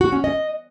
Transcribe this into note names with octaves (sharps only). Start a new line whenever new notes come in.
F#4
C#4
D#5